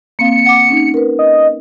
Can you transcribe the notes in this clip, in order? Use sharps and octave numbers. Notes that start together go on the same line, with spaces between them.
A#3 C4 F5 C#7
F#5 D6
C#4 D#4
A#4 B4
D#5